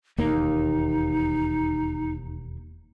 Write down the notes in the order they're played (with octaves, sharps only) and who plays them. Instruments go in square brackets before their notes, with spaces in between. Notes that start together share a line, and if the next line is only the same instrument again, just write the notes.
[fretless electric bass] E1 D#2 A#3 [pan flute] D#4